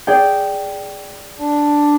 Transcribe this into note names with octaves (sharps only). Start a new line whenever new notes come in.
G#4 D5 G5
D4